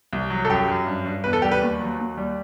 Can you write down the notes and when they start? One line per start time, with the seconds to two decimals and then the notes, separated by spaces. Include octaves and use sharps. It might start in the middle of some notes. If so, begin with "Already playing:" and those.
0.13 C2
0.30 F#3
0.45 A4
0.49 F#2 G4
0.68 F#2
0.87 G2
1.06 G2
1.24 E2 B4
1.33 A4
1.42 G3 G4
1.52 B4
1.62 D#2
1.79 F#3
1.99 D#2
2.18 G3